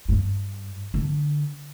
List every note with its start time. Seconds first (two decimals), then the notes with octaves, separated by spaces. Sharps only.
0.09 G2
0.94 D3